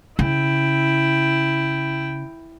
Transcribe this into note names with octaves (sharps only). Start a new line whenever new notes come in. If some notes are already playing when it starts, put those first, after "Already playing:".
C#3 E4 G5